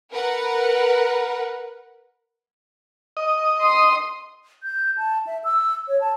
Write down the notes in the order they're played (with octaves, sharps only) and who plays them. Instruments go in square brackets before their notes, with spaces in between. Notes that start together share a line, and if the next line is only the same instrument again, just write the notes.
[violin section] A#4 B4 F#5
[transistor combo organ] D#5
[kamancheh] C6 D#6
[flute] G6
A5
E5
E6
C#5
A5